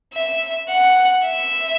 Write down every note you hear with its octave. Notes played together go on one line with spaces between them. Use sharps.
E5
F#5
E5